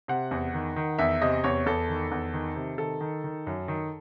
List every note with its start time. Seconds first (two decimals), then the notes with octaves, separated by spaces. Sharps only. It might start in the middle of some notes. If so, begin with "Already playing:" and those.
0.08 C3 F#5
0.31 E2
0.54 D#3
0.76 D#3
0.99 E2 E5
1.22 C3 D#5
1.44 E2 C#5
1.66 E2 A4
1.89 D#3
2.11 E2
2.34 D#3
2.56 C3
2.78 D#3 A4
3.01 D#3
3.24 D#3
3.47 F#2
3.68 D#3